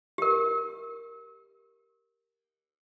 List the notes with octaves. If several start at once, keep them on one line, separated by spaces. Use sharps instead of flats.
G4 A#4